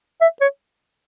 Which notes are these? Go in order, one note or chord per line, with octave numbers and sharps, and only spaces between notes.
E5
C#5